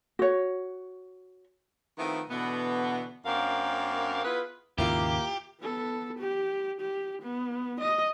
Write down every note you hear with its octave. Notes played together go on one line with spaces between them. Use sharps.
F#4 C#5
D#3 F3 A3 B3 C4 E4
B2 D3 E3 B3
F#2 A#3 C4 D4 A#4 F5
B3 E4 F4 G#4 B4
D#2 G#2 C#3 A#3 E4 F4 G4
B3 A4
G4
G4
B3
D#5